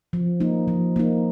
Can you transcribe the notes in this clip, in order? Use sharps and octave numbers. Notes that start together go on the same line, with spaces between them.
F3
A#3 D#4
F3
A#3 D#4